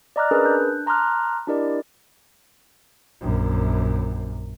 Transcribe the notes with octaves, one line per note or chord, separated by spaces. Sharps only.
D5 D#5 A#5 D6 F6 F#6
C#4 D4 G#4 A#4 B4
D4 A5 F#6 G6
A5 A#5 C6 D6 F6 F#6
D4 E4 G4 A#4 D5 D#5
A#1 F#2